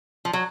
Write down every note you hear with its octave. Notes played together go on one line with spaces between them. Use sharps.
F3
F#3